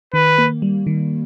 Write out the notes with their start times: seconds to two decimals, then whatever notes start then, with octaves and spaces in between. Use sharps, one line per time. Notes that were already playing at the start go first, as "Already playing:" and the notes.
0.13 D#3 B4
0.38 A#3
0.62 G3
0.87 D#3